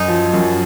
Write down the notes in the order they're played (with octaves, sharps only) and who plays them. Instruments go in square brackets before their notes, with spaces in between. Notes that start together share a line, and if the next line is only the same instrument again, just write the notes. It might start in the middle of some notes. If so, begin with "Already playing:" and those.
Already playing: [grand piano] F#2 [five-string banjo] D#4
[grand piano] F3
F#2